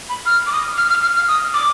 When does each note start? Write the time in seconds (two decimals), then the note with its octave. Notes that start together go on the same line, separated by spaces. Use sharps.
0.09 B5
0.26 F6
0.47 D6
0.52 D#6
0.78 F6
0.90 F6
1.03 F6
1.16 F6
1.28 D#6
1.54 D6